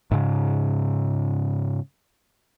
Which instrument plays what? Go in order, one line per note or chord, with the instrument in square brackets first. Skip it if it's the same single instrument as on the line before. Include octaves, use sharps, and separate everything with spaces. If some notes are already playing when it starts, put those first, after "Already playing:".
[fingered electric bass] G#2 C#3